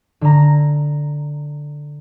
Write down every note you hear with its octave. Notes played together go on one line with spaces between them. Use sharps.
D3 A#5